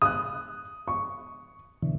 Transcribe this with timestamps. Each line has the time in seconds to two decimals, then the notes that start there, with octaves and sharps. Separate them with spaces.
0.02 D#6 F#6
0.88 C#6
1.82 B2 D3 E3